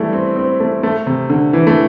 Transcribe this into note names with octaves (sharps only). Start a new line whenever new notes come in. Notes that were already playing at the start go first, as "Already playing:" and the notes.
Already playing: E3 G3 A3
C4
C4
A3
A3
C3
D3
E3
A3